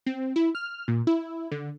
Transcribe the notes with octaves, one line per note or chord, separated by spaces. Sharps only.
C4
E4
F6
A#2
E4
D3